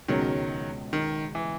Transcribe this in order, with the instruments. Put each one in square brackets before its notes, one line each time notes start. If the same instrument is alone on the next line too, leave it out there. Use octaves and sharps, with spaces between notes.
[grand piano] C#2 B2 G#3 C#4 [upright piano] D#3 F#3
[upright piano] D#3
E3